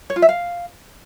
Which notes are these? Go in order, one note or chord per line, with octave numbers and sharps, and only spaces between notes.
C#5
F4
E5
F5